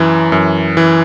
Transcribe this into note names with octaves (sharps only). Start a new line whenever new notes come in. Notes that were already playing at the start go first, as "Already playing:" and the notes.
Already playing: F#2 E3
F#2
E3